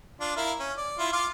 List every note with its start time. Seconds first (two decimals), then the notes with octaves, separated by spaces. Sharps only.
0.21 D4 F4
0.37 E4 A#4 F5
0.60 C#4
0.77 D5
0.99 E4 F4
1.13 F4 F5 D6